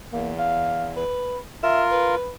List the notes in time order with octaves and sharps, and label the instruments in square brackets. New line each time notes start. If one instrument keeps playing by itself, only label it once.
[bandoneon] E2 [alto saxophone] A#3
[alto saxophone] F5
B4
[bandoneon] F4 A#4 [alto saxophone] E5
[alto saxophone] B4